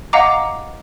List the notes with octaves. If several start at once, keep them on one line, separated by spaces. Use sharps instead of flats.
D#5 F5 F#5 A#5 D6